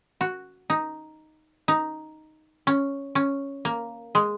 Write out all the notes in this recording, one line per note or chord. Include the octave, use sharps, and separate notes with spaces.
F#4
D#4
D#4
C#4
C#4
A#3
G#3